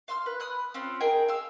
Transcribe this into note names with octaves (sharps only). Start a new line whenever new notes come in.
F5 C6 E6 F6
B4
B5 D#6 F6 F#6
C4 C#4 F4
D#4 G#4 A#4 G5
F5 E6